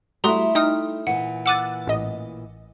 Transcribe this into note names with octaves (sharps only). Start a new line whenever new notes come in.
G3 A3 E4 F#4 A#5 C6 D#6
D#4 G5 D#6 F6
A#2 E3 F#5
F#5 D6 E6 F#6 A6 D#7
A1 D#5